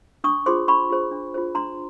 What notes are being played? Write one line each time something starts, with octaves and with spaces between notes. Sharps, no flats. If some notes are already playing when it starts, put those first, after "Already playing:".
D4 C#6 D#6
F4 G#4 C5 C6 D6
D4 B5 C#6
F4 G#4 C5
D4
F4 G#4 C5
D4 A#5 C6